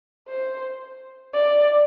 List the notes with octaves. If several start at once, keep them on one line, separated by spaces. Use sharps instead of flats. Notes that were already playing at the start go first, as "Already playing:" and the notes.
C5
D5